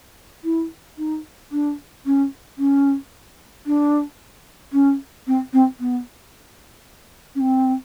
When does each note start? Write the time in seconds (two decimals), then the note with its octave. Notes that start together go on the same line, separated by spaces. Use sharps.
0.44 E4
0.98 D#4
1.51 D4
2.05 C#4
2.58 C#4
3.66 D4
4.72 C#4
5.27 C4
5.53 C4
5.80 B3
7.35 C#4
7.40 C4